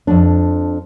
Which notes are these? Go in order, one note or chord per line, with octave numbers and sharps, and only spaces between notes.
F2 G#2 D4